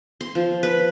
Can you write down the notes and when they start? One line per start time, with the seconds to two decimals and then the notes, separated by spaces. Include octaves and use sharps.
0.21 C6
0.35 F3
0.63 B4